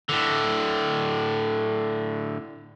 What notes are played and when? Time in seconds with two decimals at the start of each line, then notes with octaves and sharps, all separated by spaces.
0.09 A2 D3